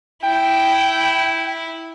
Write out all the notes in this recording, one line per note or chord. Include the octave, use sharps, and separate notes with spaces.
E4 G5